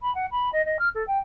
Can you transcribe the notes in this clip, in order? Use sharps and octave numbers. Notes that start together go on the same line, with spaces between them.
B5
F#5
B5
D#5
D#5
F6
A4
G5